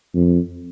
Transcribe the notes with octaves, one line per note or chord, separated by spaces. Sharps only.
F2